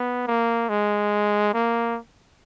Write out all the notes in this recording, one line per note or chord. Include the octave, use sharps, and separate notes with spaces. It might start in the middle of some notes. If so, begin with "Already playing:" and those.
Already playing: B3
A#3
G#3
A#3